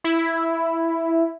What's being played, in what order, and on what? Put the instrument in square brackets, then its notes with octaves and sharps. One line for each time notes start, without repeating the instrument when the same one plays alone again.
[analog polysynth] E4